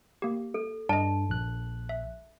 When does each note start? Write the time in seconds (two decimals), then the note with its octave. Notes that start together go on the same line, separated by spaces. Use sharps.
0.22 A#3 G4
0.54 A4
0.89 G2 D5 D#5 A5
1.29 A#1 F#6
1.89 E5